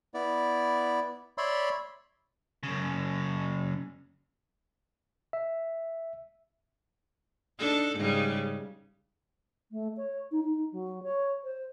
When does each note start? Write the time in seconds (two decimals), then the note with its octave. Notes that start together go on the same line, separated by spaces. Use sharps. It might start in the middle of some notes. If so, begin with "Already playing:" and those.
0.14 B3 E4 D5
1.38 C#5 D5 E5 B5 C6
2.63 F#2 C#3
5.33 E5
7.59 D4 D#4 A4
7.97 G#2 C#3 G3
9.71 A3
9.97 C#5
10.31 D#4
10.44 D#4
10.72 F#3
11.03 C#5
11.44 C5